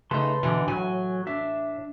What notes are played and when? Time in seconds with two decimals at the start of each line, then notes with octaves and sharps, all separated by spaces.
0.11 C#3 A3 D#4 B4 A5 C6
0.43 B2 D3 E3
0.68 A2 F#3 G#5
1.27 D4 E5